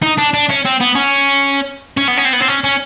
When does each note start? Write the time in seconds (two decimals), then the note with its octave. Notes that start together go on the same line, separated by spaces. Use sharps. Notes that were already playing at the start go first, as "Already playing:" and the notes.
0.03 D#4
0.18 D4
0.34 D4
0.49 C#4
0.65 C4
0.80 B3
0.95 C#4
1.97 C#4
2.08 B3
2.17 C#4
2.25 C4
2.33 B3
2.40 C4
2.48 C#4
2.64 C#4